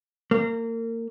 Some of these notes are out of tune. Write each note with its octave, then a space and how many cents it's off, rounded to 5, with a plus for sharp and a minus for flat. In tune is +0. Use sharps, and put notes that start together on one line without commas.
A#3 -30